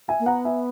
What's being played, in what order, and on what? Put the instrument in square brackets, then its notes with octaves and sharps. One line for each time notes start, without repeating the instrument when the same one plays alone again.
[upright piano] E5 G#5
[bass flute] A#3
[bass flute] B3 [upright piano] F#5 A#5
[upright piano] E5 G#5